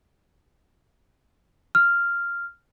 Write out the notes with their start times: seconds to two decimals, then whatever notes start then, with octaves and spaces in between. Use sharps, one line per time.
1.75 F6